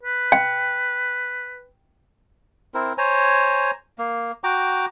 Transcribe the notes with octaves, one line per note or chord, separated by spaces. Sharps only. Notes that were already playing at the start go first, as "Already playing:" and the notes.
B4
G5
C4 E4 A#4
C5 C#5 G#5 A#5
A#3
F#4 G5 A#5 D6